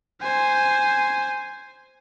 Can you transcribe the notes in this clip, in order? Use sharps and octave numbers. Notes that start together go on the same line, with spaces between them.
C5 G#5